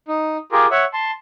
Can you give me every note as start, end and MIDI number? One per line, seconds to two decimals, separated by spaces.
0.08 0.37 63
0.52 0.67 65
0.52 0.67 67
0.52 0.67 68
0.52 0.67 70
0.71 0.85 73
0.71 0.85 76
0.71 0.85 78
0.93 1.11 81
0.93 1.11 84